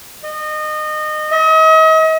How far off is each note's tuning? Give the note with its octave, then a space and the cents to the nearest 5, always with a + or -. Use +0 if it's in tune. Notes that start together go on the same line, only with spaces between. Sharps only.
D#5 -25
D#5 +40